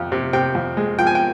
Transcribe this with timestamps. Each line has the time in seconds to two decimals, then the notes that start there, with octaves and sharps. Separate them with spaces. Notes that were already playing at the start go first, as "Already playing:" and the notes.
Already playing: F2 C3
0.12 C3
0.33 C3 G5
0.55 F2
0.77 G#3
0.98 F3 G5
1.07 G#5
1.15 G5